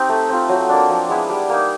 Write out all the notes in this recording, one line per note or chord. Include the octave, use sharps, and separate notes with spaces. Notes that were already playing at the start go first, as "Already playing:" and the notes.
Already playing: C4 D#4 G4
A3
C4 F4
F#3
A#3 D4
F3
G#3 B3 E4
G3
A#3 D#4